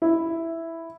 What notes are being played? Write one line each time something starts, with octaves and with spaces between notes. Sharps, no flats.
E4